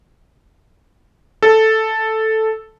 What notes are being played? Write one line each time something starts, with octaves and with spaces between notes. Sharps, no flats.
A4